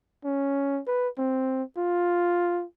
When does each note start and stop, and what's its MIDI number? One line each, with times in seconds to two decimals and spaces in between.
0.24 0.81 61
0.87 1.09 71
1.18 1.63 60
1.77 2.65 65